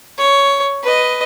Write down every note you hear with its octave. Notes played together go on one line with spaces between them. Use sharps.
C#5
B4 D#5